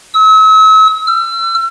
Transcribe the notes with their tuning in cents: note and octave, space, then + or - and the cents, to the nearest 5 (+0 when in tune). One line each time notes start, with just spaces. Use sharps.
E6 -40
E6 +40